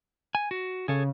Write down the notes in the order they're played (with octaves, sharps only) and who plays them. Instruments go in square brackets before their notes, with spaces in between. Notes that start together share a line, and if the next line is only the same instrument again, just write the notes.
[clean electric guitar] G#5
F#4
[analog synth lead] C#3 [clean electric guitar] G#4 A4 C#5